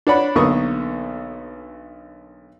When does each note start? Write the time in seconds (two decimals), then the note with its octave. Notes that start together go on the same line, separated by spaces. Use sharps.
0.07 D4 C#5 D5 F#5 B5
0.35 B1 D3 A#3 B3 C#6 D#6